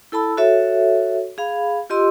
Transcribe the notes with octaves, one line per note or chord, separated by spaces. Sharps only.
E4 A4 A5 B5 E6
F#4 A4 C#5 E5
G#4 F5 B5
F4 G4 D#5 C6 E6